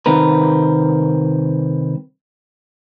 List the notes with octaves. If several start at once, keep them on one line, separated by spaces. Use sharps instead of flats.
C2 D#3 C4 A#4 B4